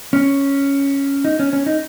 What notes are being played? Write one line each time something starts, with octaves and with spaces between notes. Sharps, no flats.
C#4
D#4
C#4
C#4
D#4